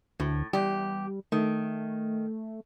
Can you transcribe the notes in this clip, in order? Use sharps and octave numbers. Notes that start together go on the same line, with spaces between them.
D2 A2
E2 G3 G4
D#3 A3